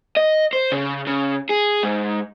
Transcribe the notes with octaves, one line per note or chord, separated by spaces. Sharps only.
D#5
C5
C#3
C#3
G#4
G#2